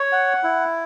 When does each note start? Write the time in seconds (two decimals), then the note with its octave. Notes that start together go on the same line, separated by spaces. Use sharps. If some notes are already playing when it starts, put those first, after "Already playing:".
Already playing: C#5
0.12 F#5
0.43 E4